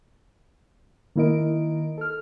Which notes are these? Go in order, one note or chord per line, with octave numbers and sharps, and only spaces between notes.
D#3 A#3 E4 A#4 D#5 D7
A4 F6